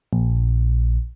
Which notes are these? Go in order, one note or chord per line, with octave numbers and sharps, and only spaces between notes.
A#1